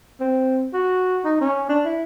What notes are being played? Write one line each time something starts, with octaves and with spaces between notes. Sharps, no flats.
C4
F#4
D#4
C#4
D4
E4